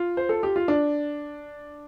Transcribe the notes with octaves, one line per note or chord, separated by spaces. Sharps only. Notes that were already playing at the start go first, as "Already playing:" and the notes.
Already playing: F4
C5
A4
G4
F4
D4